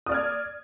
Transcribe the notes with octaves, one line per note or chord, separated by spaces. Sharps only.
D5 D#6 F6 G#6